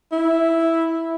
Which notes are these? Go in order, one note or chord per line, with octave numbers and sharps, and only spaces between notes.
E4